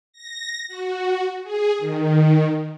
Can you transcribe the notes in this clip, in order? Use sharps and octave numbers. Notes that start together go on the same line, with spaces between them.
A#6
F#4
G#4
D#3